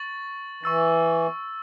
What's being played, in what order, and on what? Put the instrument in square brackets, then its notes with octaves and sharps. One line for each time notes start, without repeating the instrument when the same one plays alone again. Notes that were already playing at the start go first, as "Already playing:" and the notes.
Already playing: [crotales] C#6 A6 F#7
[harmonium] E3 [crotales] C#6 E6 A6